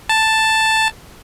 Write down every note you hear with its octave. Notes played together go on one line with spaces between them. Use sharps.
A5